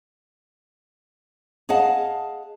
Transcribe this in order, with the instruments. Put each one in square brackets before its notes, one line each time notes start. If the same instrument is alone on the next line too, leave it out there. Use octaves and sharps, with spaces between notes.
[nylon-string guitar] G#4 D#5 F5 F#5 A5